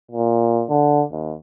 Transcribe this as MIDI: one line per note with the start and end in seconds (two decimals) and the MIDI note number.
0.11 0.64 46
0.69 1.02 50
1.12 1.34 39